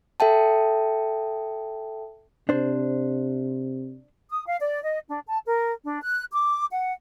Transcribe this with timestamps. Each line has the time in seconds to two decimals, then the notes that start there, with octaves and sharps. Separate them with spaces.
0.20 A4 E5 G5 A5
2.49 C3 D4 C5
4.30 D#6
4.46 F5
4.60 D5
4.83 D#5
5.09 D4
5.26 A5
5.46 A#4
5.84 D4
6.02 F#6
6.32 D6
6.72 F#5